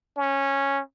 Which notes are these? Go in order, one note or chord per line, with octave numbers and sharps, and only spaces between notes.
C#4